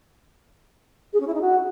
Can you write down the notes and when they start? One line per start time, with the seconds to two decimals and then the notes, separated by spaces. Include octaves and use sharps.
1.13 G#4
1.20 C#4
1.27 E4
1.34 D#4
1.41 F#4